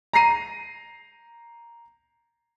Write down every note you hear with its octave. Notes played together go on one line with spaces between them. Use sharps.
A#5 A#6 C7 D#7